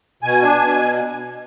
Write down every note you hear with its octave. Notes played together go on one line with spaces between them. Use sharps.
B2 G#5
D4
B2